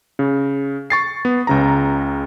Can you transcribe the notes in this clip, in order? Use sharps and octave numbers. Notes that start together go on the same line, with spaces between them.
C#3
C#6 A6 C7
B3
C#2 C#3 A#5